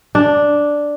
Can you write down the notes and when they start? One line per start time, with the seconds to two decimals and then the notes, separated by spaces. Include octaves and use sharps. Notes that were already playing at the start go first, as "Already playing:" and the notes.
0.15 D4